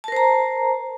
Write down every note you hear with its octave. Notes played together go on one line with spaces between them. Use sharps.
A#4 C5 A5 A#5